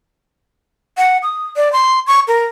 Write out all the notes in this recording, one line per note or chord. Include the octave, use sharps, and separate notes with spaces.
F#5
D#6
D5
C6
C#6
A#4